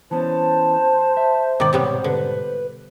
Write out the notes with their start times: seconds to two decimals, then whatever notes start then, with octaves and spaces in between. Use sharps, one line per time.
0.11 E3 B3 C#4 C5 A5
1.17 E5
1.60 G#2 B2 D#3 D5 D6
1.73 C3 G3 B3 C#5
2.04 D3 B4